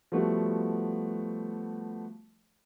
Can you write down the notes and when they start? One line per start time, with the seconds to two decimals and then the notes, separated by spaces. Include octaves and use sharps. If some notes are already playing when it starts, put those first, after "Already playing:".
0.12 F3 G3 A3 B3 F#4